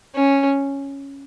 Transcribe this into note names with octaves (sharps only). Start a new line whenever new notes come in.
C#4